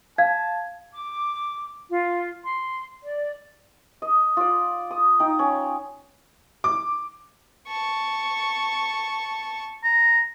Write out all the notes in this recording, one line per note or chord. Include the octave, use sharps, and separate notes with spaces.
F5 A5 G#6
D6
F4
C6
D5
D#5
F4 D5
D#6
D#4 G5 A#5
C#4
D6
A5 C#6
A#5